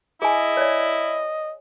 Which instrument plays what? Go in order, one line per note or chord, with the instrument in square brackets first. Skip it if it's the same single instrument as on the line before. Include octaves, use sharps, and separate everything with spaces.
[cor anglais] E4 [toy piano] G#4 G#5 [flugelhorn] D#5
[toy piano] C#5 D5